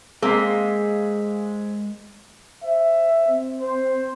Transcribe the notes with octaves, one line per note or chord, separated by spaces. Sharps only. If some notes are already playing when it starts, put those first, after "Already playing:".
G#3 A#3 C4 G#4 F5 B6
C5 E5
C4
C5